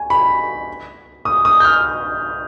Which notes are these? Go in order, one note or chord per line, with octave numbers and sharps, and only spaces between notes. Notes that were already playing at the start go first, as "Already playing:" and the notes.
Already playing: G#5
B5
D#6
D#6
G6
F6